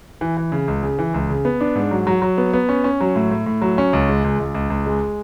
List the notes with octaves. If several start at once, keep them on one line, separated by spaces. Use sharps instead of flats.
E3
E3
C#3
C#2
C#3
E3
C#2
C#3
B3
D4
G#2
F#3
F#3
F#3
B3
B3
C#4
C#4
F#3
A2
A2
A2
F#3
C#4
C#2
G#3
C#2
C#2
C#2
C#2
G#3